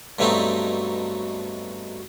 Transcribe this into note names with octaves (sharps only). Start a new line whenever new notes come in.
G2 B2 F#3 A3 C4 D#4